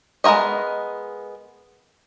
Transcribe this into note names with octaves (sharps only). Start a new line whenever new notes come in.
G#3 B3 A#4 C#5 D#5